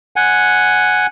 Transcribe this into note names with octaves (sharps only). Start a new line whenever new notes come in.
F#5 G#5